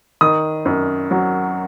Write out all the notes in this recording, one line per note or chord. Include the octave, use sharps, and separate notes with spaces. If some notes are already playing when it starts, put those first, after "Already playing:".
D#3 D#6
F#2
F#3